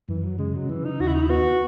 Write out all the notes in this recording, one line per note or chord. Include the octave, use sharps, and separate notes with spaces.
F#2 E3
F#3
C#3 G#3
F#3
C#3 E3
D#4
D#2 F#4
E4
D#4
E4
B3 F#4